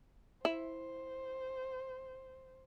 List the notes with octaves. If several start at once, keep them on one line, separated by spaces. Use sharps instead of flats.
E4 C5